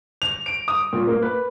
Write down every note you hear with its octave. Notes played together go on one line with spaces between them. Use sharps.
F7
D7
D#6
A#2
A#3
B4